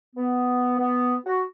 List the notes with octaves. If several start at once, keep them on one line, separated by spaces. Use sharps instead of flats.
B3
B3
F#4